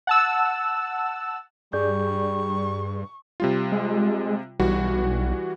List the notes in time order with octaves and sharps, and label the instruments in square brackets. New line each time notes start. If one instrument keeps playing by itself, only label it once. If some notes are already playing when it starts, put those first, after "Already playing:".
[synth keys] F#5 A5 E6
[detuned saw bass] G2 [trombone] G3 [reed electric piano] G#4 D5 G6 [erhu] C#6
[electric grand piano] C3 G3 F4
[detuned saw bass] G#3
[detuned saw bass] B1 [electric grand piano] E3 G3 F#4